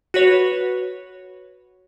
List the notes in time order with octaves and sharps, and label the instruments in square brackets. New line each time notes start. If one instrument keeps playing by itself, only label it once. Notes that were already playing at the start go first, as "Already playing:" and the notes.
[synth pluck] F#4 B4 C#5